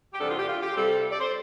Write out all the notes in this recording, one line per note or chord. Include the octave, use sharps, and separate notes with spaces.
G4
E2 C3 G3 D4 A4
F4
G4
F4
G4
C3 G3 C4 A4
D5
C5